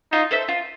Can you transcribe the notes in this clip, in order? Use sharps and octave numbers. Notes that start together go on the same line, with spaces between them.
D#4 F4
A4 C5 E5
F4